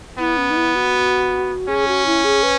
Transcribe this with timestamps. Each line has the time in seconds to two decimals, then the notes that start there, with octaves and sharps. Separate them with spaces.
0.19 B3 E4
0.37 C#4
0.50 D#4
0.56 E4
0.75 F#4
1.68 C#4 G#4
1.88 F#4
2.06 E4
2.24 G#4
2.43 B4